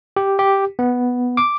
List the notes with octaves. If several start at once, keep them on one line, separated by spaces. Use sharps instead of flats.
G4
G4
B3
D6